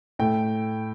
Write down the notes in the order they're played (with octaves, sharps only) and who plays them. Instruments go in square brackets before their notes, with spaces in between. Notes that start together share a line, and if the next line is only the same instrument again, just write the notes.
[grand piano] A2 A3 G5